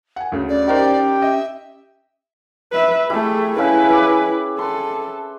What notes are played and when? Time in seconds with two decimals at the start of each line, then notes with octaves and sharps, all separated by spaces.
0.16 F#5 G#5
0.32 D2 C#3 A4
0.49 C#4 D5
0.67 D#4 G4 A#4 C5
1.22 D#5 E5
2.72 B4 E5
3.10 A3 E4 G4 G#4 B5
3.58 C#3 E4 B4 E5 F5
3.90 E5 G#5 D6
4.59 A4 B4 C6